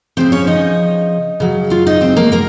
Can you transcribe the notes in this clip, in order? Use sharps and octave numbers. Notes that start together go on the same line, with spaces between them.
C#3 F3 C4 C5
C#4 C#5
D#4 D#5
C#3 F#3
F4 F5
D#4 D#5
C4 C5
A#3 A#4
A#3 A#4